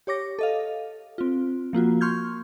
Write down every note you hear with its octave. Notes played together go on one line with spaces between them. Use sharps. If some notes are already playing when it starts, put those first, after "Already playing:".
G4 C#5 D6 A#6
A4 D#5 F5
C4 F4
F3 A#3 F4 F#4
C6 C#6 F6 G6 G#6